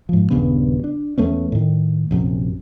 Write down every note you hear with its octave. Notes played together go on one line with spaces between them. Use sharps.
G#2 F3
D#1 G2 C#3 B3
D4
E2 A3 B3 C#4
A2 D#3
A#1 F#2 C3